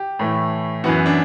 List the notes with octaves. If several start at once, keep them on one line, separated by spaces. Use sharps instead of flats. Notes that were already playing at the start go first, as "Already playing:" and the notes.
Already playing: G4
A2 E3 A3
F#2 E3 B3 F#4
D4